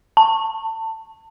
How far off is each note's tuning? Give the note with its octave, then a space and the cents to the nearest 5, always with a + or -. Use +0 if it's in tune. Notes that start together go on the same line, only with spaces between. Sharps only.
A5 +25